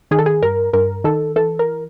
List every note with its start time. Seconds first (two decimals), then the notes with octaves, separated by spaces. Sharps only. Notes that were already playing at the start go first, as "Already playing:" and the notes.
0.11 D#3 G#4
0.19 A4
0.26 G#4
0.42 G2 A#4
0.73 G2 A#4
1.04 D#3 A4
1.36 E3 A4
1.59 A#4